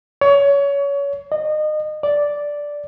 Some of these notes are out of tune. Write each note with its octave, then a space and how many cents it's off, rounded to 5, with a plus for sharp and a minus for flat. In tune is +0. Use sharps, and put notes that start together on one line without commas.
C#5 +25
D#5 -30
D5 -5